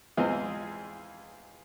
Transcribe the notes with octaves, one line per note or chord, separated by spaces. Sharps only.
E2 E3 G#3 C4 F4 G#4